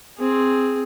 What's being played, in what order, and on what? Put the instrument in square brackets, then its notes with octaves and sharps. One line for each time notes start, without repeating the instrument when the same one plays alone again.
[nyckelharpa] C4 G#4